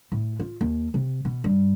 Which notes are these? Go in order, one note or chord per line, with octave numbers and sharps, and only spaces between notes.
A2
F4
D#2
C3
B2
G2